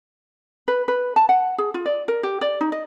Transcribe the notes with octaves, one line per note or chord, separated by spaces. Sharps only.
B4
B4
A5
F#5
G#4
F4
D5
A#4
G4
D5
D#4
D#5